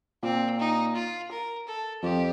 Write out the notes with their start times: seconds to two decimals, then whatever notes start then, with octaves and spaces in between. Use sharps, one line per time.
0.23 A#2 C4
0.60 D#4
0.95 F4
1.31 A#4
1.67 A4
2.03 F2 G4